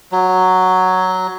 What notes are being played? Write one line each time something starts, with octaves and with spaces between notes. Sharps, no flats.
F#3